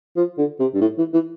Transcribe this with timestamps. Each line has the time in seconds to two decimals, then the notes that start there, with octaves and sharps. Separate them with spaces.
0.16 F3
0.38 D3
0.59 C3
0.74 G2
0.81 A2
0.98 E3
1.13 E3